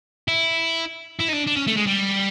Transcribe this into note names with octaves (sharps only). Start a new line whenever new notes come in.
E4
E4
D#4
D4
D4
C#4
A3
G#3
G3